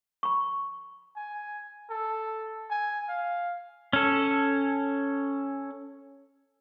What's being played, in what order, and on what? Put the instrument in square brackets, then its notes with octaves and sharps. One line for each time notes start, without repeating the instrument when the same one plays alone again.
[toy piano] B5 C#6
[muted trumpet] G#5
A4
G#5
F5
[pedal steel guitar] C#4 A4